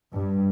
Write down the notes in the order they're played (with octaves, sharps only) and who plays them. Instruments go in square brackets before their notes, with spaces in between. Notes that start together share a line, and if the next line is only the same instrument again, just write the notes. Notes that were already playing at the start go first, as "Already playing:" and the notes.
[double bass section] G2